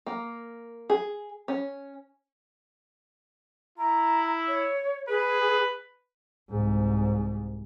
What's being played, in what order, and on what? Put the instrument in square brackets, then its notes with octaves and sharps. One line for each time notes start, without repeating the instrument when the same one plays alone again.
[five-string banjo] A#3
G#4
C#4
[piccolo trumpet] E4 [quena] A#5
[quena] C#5
[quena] G#4 [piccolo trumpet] B4
[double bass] C2 G#2